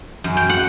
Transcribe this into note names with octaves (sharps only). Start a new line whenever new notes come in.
F#2
G5
F#5